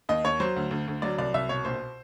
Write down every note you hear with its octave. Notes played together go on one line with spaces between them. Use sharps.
D#2 D#5
D#2 C#5
F#3 C5
D2
D2
D2
F#3 D5
C2 D5
C2 E5
B2 C#5
A#1 C5